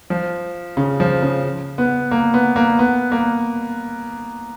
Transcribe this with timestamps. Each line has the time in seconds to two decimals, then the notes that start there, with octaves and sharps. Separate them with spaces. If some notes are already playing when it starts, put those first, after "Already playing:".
0.10 F3
0.77 C#3
1.00 F3
1.22 C#3
1.78 B3
2.11 A#3
2.34 B3
2.56 A#3
2.79 B3
3.12 A#3